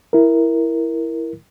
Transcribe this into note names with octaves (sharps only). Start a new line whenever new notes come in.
E4 A#4